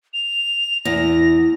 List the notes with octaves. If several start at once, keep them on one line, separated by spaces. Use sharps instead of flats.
F7
E2 A#6